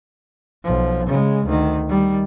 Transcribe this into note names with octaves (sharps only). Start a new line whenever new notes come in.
B1 F3
C#3 G#3
D2 D#3
D#3 G3